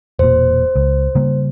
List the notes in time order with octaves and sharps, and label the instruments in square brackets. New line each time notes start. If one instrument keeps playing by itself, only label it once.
[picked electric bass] E1 A#2 [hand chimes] C5
[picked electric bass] C#2
C#3 G3 A#3